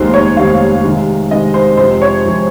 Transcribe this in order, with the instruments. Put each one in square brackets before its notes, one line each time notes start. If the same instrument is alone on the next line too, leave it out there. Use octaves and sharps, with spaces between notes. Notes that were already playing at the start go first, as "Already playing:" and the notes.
Already playing: [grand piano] F1 D#2 D#3 G#3 [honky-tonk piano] C5
[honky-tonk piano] C#5
[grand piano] F1 D#2 D#3 G#3 [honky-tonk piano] F5
[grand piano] C3 D#3 G#3
[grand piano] C3 D#3 G#3 [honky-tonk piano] D#5
[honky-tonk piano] C5
[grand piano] F2 C3 F3 G#3 C4 [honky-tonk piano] C5
[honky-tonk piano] C#5
[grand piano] F2 C3 F3 G#3 C4